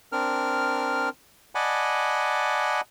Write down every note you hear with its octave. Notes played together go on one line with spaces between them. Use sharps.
C4 D4 A#4 F6
D5 D#5 F#5 G#5 A5 B5